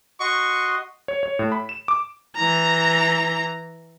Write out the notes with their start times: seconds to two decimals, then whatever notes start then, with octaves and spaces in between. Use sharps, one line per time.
0.20 F#4 D#5 C6 C#6
1.08 C#5
1.23 C#5
1.39 A2
1.52 B5
1.69 E7
1.88 D6
2.36 E3 A#5